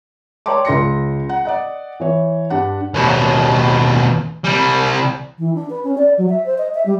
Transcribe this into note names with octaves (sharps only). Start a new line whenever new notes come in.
C#5 D5 G5 A5 C6 D6
C#2 C6 A#6 C#7
F#5
D5 D#5 F#5
E3 C#5
G2 D4 G4 F#5
D#2 B2
C2 G3
E3
D4
B4
C#4
D5
F#3
E5
C5
D#5
E5
G3